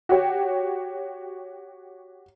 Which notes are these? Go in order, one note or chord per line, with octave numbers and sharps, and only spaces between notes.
F#4 G4 C#5